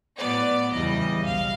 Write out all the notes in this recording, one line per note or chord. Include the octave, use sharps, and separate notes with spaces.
A2 F#3 B3 D5
E2 C#3 E3 G3 D#5
B1 F5